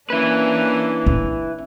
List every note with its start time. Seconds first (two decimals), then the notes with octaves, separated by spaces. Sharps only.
0.10 A#3 C#4 D4 E4 B4
1.06 C#4